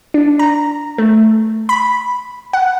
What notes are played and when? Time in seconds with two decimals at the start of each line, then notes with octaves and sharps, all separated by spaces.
0.14 D4
0.39 A#5
0.98 A3
1.69 B5
2.53 F#5